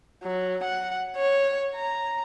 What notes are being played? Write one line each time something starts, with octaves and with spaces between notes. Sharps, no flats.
F#3
F#5
C#5
A#5